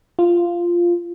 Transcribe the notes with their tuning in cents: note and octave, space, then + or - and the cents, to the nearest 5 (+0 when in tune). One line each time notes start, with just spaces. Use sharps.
F4 -10